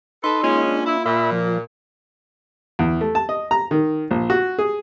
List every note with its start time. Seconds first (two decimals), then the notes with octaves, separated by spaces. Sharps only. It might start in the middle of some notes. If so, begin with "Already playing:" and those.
0.24 D#4 A4 B4 C6
0.43 G#3 A#3 C#4 F4
0.68 D4
0.86 E4
1.06 A#2 E5 B5
1.32 F3
2.79 E2
3.01 A3
3.15 A5
3.29 D#5
3.51 A#5
3.71 D#3
4.11 A#1
4.30 F#4
4.58 G#4